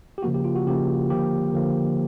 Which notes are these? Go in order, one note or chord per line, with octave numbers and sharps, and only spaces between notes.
G4
C#3 F3 A#3 F#4
G4
F4
F#4
C#3 F3 A#3 G4
D3 F3 A#3 G4
D3 F3 A#3